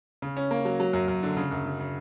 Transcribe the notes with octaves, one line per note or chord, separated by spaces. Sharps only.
C#3
C#4
A#3
F#3
F#3
F#2
F#2
D3
C#3
F#2
C#3
C#3